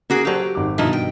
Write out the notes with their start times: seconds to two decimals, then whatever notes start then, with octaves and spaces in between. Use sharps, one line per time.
0.10 C#3 A#3 F#4 G#4
0.25 F#3 F#4 G4 A4 C5
0.41 F#4
0.55 G#1 C4 D6
0.78 G2 B2 D#3 F3 D#4 E4
0.93 G5